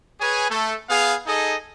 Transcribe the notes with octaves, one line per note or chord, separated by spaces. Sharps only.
G#4 B4 C#5 G#5
A3 A4
B3 G#4 F5
D#4 G#4 A4 D#5